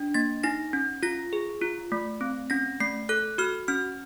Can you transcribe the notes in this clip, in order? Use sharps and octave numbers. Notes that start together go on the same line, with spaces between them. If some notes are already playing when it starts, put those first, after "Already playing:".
Already playing: D4
A#3 A6
D#4 A#6
C#4
F4 A#6
G#4
F4
A3
C4
C#4 A#6
A3 C7
A4 F#6
F#4 F6
C#4 F6